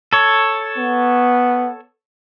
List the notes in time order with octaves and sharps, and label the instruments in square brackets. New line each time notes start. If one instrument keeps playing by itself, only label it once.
[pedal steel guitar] A4 C#5
[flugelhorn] B3